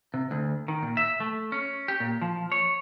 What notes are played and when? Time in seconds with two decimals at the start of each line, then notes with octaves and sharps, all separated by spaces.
0.14 C3
0.31 D2
0.68 D#3
0.83 A#2
0.97 E5
1.20 A3
1.52 C#4
1.88 G4
2.00 A#2
2.22 F3
2.52 C#5